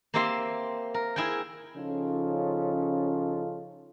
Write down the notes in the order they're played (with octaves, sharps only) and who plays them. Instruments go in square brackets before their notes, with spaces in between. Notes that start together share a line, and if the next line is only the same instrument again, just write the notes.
[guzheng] A#3 C4 G4 E5 C6
A#4
E4 G#4 A#4 G5
[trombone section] C#3 F3 C#4 D#4 F4 A4